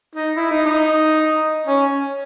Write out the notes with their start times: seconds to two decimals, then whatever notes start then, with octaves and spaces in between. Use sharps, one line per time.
0.15 D#4
0.37 E4
0.51 D#4
0.66 D#4
1.67 C#4